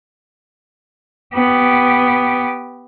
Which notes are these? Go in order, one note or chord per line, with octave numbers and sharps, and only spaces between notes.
B3 G4